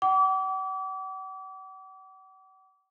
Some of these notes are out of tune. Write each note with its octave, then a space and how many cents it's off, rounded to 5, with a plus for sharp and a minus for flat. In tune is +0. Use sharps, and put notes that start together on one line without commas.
F#5 +45 D6 -35